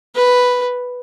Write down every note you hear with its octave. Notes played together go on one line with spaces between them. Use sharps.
B4